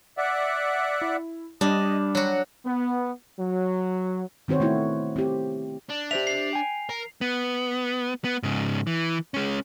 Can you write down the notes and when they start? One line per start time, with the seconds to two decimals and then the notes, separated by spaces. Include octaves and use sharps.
0.18 D5 E5 F#5
1.01 E4
1.61 G3 D4 D#5
2.15 F#3 F#4 F#5
2.66 B3
3.40 F#3
4.48 D#3 C4 F#4 C5 C#5
4.60 A3 B3 E4 F#4
5.16 C4 G4
5.89 D4
6.11 G4 C5 E5 F7
6.27 C7
6.53 G5 G#5
6.89 A#4
7.21 B3
8.24 B3
8.43 G#2 C#3
8.87 E3
9.34 G#3 C#4